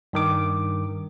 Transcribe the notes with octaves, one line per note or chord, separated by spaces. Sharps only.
G2 D#3 D6